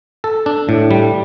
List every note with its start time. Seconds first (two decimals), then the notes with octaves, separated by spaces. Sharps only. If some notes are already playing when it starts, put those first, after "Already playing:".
0.24 A4
0.46 D4
0.69 A2
0.91 G3